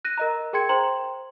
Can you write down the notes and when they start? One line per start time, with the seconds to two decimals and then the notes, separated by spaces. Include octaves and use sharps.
0.05 F#6 A#6 D#7
0.18 A#4 D#5 A#5
0.53 G#4 A#4 G5 C6 G#6 C#7
0.69 C5 G5 A#5 C6 F#7